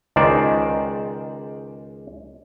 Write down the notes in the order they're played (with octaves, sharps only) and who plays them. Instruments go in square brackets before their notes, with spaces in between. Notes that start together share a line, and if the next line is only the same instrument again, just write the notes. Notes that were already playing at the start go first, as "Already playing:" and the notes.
[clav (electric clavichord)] C#2 D#3 G#3 C5 D5